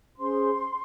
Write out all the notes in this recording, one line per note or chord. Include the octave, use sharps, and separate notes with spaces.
C#4 G#4 C5 C6